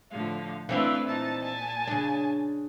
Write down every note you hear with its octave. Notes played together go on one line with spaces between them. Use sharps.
A2 D3 F3 F5
E3 A3 C4 D4 E4 B4 F5
A#2 D#4 A5
G#5 A5
C#3 D4